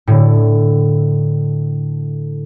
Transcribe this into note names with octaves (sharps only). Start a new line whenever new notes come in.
A2 D3